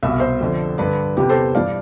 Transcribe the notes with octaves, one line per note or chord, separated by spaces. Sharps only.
C2 B2 E5
F5
C5 E5
F2 D3
G2 D3 B4 D5
E2 C3 E3 G4 B4
A4 C5
G2 E3 D5 F5